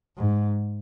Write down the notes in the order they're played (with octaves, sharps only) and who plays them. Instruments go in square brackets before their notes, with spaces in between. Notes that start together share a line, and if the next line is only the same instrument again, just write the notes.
[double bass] G#2